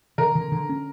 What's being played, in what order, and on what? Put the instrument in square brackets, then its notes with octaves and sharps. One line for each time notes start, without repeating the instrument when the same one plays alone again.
[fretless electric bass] D3 [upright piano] A#4
[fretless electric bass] D3
D3
C#4